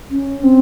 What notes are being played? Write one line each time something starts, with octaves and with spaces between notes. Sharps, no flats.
C#4
C4